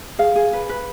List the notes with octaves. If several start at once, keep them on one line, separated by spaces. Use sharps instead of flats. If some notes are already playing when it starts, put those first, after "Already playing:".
G#4 F5
G#4
B4
B4